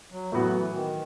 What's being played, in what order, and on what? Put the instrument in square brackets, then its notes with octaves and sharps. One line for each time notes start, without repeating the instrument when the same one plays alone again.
[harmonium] F#3
[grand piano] A2 F#3 B3 F#4 [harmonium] E3
[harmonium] E3
D#3